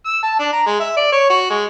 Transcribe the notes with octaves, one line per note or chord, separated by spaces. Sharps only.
E6
A5
D4
A#5
G#3
E5
D5
C#5
F#4
G#3